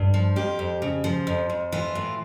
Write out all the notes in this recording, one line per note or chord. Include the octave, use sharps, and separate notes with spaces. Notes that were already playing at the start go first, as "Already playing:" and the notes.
Already playing: G2
F3
F2 G4
F2
C#3
F3
F2
F2
E3 F4
A2